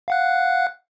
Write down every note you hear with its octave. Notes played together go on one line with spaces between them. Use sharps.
F5 F#5 F#6